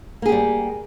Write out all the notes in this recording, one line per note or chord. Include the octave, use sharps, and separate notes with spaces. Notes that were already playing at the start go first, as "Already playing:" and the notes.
G3 A#3 G4 G#4